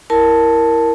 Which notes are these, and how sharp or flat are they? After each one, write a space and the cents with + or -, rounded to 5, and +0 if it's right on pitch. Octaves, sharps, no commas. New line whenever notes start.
E4 +0 A#4 +0 A5 +0